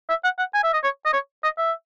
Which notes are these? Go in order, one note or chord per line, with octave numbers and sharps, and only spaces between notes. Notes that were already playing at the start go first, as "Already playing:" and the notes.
E5
F#5
F#5
G#5
E5
D#5
C#5
D#5
C#5
D#5
E5